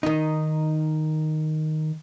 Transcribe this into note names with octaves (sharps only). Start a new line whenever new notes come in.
D#3 D#4